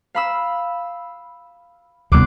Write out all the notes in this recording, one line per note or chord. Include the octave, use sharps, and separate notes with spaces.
F5 B5 E6
D#1 D2 C3 G3 B3 C6 D6 F#6